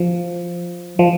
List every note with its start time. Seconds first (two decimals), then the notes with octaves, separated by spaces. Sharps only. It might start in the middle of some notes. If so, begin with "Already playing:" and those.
Already playing: F3
0.99 F3